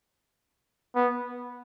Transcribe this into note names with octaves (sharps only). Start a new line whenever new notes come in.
B3